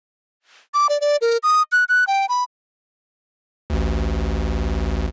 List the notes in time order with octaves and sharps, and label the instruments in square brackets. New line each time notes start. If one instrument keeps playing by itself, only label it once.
[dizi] D6
D5
D5
A#4
D#6
F#6
F#6
G5
B5
[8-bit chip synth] A1 D2